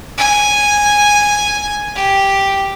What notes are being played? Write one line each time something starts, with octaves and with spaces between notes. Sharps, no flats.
G#5
G4